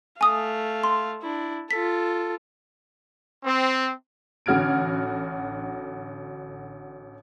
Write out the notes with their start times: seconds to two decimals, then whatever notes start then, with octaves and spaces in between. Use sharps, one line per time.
0.21 A3 F5 G#5 D#6
0.84 C6
1.22 D4 E4
1.71 F4 A4 B6
3.45 C4
4.46 A1 D3 F#4 F6 G#6 D7